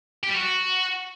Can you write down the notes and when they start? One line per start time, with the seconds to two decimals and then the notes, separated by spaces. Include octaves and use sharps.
0.24 G4
0.29 G3
0.35 F#4